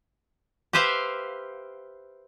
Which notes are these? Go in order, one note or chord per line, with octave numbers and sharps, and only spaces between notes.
G4 B4 C5 E5 F5